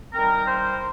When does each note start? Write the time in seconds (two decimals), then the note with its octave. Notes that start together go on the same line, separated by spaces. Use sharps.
0.13 D#3 G3 C4 A#4
0.47 C5